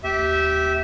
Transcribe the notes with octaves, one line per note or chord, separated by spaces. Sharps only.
D#2 G4 E5